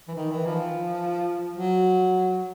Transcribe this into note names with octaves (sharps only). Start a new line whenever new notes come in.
E3
D#3
E3
F3
F#3